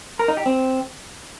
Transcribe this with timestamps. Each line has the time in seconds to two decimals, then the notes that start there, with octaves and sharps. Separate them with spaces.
0.19 A#4
0.28 D#4
0.37 G4
0.46 C4